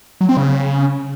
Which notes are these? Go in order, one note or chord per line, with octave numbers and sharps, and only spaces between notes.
F#3
C4
C#3